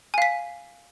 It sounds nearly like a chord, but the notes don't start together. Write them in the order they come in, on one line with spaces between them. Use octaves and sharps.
G#5 F5 B6